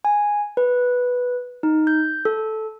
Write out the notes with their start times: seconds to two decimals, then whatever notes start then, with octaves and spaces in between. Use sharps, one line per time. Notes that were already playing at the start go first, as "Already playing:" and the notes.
0.05 G#5
0.57 B4
1.63 D#4
1.87 G6
2.25 A4